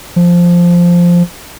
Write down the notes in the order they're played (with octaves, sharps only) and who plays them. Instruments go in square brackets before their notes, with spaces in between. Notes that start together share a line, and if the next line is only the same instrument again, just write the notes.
[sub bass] F3